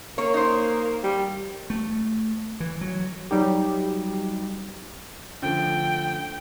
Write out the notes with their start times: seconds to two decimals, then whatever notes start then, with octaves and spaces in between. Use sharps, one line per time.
0.18 A#3 C#5
0.34 D#4 C5
1.04 G3
1.70 A3
2.60 E3
2.81 F#3
3.31 F#3 G3 D#4 G4
5.42 D3 F3 A3 G5